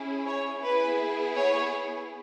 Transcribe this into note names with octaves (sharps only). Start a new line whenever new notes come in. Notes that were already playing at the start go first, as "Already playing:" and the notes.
Already playing: C#4 E4 G#4
C#5
B3 E4 G#4 B4
C#5